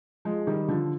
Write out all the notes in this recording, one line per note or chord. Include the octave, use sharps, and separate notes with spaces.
F3 G#3
D#3 G3
D3 F3